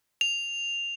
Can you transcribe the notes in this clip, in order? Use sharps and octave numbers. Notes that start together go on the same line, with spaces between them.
F7